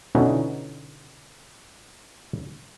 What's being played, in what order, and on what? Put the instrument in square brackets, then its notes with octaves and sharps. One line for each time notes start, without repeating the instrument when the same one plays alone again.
[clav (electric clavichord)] B2 D3 C#4 D#4 E4 F#4